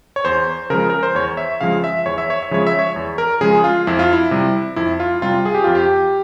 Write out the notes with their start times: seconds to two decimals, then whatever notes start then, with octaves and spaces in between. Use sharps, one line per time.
0.16 C#5
0.25 E2 C5
0.70 C#3 F3 G#3 A#4
0.90 A#4
1.03 C5
1.15 E2 C#5
1.37 E5
1.61 C#3 F3 G#3 F5
1.84 E5
2.06 E2 C#5
2.18 E5
2.30 C#5
2.43 E5
2.51 C#3 F3 G#3 C#5
2.67 E5
2.79 C#5
2.96 E2
3.18 A#4
3.41 C#3 F3 G#3 G#4
3.64 F4
3.87 F2 E4
3.99 F4
4.13 E4
4.31 C3 G3
4.76 F2 E4
5.00 F4
5.22 C3 G3 F4
5.45 G#4
5.55 G4
5.64 F2 F4
5.75 G4